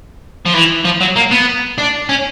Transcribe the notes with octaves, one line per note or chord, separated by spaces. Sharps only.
F3
E3
F3
F#3
A#3
B3
D4
C#4